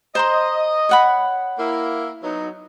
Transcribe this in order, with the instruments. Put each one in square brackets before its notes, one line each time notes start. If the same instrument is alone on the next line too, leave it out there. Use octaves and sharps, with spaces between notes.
[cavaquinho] C5 A#5 C6 [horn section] D#5
[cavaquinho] C#5 F#5 B5
[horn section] A#3 E4
F#3 B3 D#4